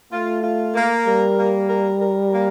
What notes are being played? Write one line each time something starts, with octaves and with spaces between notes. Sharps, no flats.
A3 F4
F4
A#3
G3 A#4
A#3
A#4
A#4
A#3